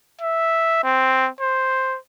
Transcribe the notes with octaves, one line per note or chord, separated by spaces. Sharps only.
E5
C4
C5